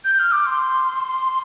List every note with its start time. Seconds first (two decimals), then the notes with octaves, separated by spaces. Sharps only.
0.04 G6
0.19 F6
0.32 D6
0.46 C6